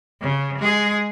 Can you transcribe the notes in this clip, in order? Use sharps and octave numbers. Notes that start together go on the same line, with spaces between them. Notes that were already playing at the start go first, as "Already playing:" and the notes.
C#3
G#3 G#4